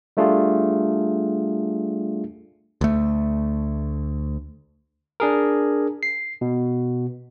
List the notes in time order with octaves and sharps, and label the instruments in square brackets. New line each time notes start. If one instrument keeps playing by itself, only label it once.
[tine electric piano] G3 A3 D4 F4 G#4
[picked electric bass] D2 A3
[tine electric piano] D4 G#4 A#4
C7
B2